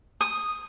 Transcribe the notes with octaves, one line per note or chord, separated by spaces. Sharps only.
D#6